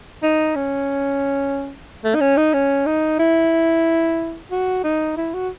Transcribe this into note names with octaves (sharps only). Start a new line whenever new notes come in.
D#4
C#4
A3
D#4
C#4
D#4
C#4
D#4
E4
F#4
D#4
E4
F#4